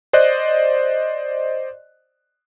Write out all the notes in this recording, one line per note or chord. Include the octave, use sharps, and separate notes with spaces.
C5 D5 D#5 F#6